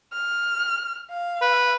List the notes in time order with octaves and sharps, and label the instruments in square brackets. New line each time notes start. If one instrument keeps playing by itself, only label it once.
[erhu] F6
F5
[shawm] B4